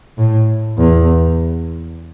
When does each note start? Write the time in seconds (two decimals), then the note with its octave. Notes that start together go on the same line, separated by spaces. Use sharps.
0.18 A2
0.78 E2